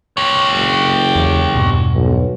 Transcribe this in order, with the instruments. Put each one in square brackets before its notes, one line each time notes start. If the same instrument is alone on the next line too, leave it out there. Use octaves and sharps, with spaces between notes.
[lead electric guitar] G4 C#5
[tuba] F#1
[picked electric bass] E2
E2 G2 B2
[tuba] B1